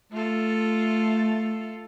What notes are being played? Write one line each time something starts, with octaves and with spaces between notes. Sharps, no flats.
A3 F4 A4